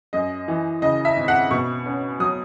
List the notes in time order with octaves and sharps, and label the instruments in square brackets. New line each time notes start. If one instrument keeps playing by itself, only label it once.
[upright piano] F#2 D#5
E3
C#3 D#5
E5
G#1
F#5
B2 C#6
C#4
F#3 D#6